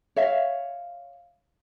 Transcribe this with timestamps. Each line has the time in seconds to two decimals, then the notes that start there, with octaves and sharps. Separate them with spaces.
0.16 C#5 E5 F5